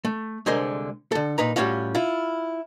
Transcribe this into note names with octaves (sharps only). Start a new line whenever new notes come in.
A3
C2 D3 G#3 A#4 C5 D#5
D3 A4
A#2 D#4 B4 A#5
A2 G3 C#4 F4 F#4 F5
E4 F4